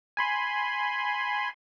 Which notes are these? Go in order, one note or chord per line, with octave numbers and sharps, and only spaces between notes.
G#5 B5 C6